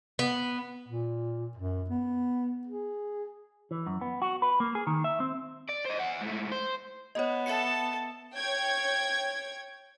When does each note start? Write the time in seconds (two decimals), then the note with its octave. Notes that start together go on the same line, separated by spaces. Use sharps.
0.19 B3
0.88 A#2
1.57 F#2
1.89 B3
2.67 G#4
3.71 E3
3.86 F#2
4.01 B3
4.22 F#4
4.42 B4
4.60 A#3
4.75 G#4
4.87 D#3
5.04 E5
5.20 C4
5.69 D5
5.86 C5 D#5
6.00 E5 F#5
6.21 G#2 A3
6.52 C5
7.15 B3 C#5 D#5
7.46 A4 E5 A5 C#7
8.35 C#5 G5 G#6